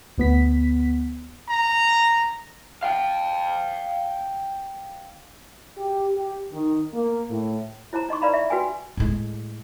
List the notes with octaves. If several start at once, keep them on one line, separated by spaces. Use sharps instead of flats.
D2 B3 B6
A#5
F5 G5
G4
G4
D#3
A#3
A2
E4 C5 A5 A#5
D#4 D#5 C6 C#6
B4 D5 F5 A#5 B5
E5
F#4 B4 G5 G#5
A2 G#3